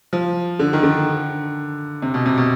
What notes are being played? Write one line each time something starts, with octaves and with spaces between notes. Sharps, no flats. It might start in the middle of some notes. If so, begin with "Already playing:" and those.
F3
D3
D#3
D3
C3
B2
C3
B2